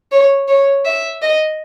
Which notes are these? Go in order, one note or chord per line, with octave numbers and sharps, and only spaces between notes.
C#5
C#5
E5
D#5